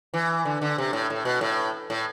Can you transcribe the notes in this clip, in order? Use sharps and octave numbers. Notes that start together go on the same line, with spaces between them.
E3
D3
D3
C3
A2
A2
B2
A2
A2